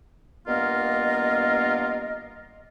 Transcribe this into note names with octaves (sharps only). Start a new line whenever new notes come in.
G2 A#3 B3 F4 A#4 D#5